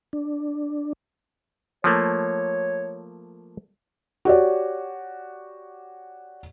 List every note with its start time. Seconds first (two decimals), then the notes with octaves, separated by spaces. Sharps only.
0.13 D4
1.84 F3 A3 A#3 C#5
4.25 F#4 G4 C#5 D5